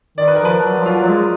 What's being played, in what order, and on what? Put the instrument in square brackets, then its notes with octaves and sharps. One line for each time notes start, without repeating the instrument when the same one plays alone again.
[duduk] D#3 [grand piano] D5
[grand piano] B4
A#4
[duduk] F3 [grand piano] B4
[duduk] F#3
F3
[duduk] F#3 [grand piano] F4
[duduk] F#3
G#3